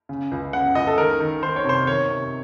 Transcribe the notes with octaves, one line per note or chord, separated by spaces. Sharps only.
C#3
C#2
C#3 F#5
C#2 D#5
A4
D#3 A#4
D#3
D#3 C5
C#5
C3 C5
D#3 C#5
C3